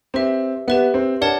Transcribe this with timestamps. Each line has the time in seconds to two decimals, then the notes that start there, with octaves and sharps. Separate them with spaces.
0.14 C4 G4 B4 E5
0.68 B3 G4 B4 E5
0.94 C4
1.21 D4 A#4 C#5 F#5 A5